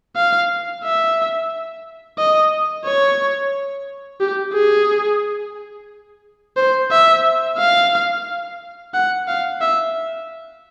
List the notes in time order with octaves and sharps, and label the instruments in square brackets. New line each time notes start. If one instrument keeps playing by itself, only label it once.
[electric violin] F5
E5
D#5
C#5
G4
G#4
C5
E5
F5
F#5
F5
E5